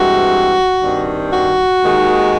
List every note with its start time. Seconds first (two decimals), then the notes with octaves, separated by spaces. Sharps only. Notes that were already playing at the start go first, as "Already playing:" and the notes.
Already playing: G2 E3 G#3 C4 F#4
0.81 G2 D#3 G3 C4
1.32 F#4
1.83 D#2 D#3 G#3